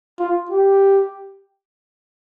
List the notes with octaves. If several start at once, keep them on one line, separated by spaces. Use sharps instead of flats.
F4
G4